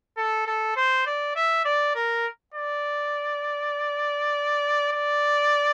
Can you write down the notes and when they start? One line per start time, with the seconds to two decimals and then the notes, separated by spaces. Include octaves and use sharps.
0.17 A4
0.47 A4
0.77 C5
1.06 D5
1.36 E5
1.65 D5
1.95 A#4
2.55 D5
4.92 D5